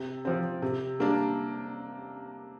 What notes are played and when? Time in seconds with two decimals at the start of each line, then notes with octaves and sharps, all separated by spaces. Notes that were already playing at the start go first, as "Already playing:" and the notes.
Already playing: C3
0.25 F3 C4
0.62 C3
0.99 G3 A#3 D4